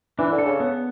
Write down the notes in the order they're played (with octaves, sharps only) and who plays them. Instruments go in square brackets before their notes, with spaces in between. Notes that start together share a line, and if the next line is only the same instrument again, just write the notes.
[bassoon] E3 [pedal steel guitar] D4
[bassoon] D3
[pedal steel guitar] A4
[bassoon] C#3
[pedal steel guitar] B3